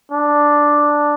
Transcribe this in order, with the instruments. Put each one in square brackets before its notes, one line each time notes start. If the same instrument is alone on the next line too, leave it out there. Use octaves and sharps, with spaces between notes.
[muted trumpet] D4